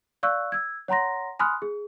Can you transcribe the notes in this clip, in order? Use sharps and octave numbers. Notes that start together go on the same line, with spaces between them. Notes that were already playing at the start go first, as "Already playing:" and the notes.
D5 F5 C#6 E6 F#6
E6 G#6
C#5 F#5 A#5 C6 A#6
G#5 B5 C6 D#6 F6 F#6
G#4